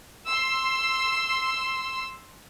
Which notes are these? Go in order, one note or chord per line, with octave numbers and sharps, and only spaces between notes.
C6 E6